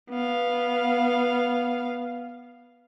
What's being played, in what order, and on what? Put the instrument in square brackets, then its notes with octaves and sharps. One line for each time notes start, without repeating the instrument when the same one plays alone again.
[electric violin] B3 F5